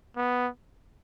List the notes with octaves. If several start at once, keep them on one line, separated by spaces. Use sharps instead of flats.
B3